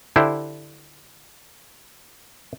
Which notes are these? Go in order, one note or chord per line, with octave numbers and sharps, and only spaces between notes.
D3 E4 G4 C5